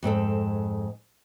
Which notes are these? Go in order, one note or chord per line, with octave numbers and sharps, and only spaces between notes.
F2 G#2 C4 A4